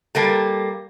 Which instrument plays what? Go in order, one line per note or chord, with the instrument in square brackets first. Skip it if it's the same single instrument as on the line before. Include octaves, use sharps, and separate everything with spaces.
[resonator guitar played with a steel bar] G3 A#3 A4